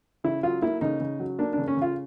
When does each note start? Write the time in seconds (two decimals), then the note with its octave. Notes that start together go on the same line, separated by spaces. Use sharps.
0.24 C#3 E4
0.43 F#3 F4
0.62 A#3 E4
0.81 C#3 D#4
1.00 C#3
1.20 F#3
1.39 A#3 D4
1.53 C#3 D4
1.68 C#4
1.77 C#3 F4